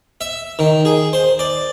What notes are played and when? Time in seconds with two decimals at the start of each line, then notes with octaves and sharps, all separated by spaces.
0.21 E5
0.59 D#3
0.85 G#4
1.13 C5
1.39 D5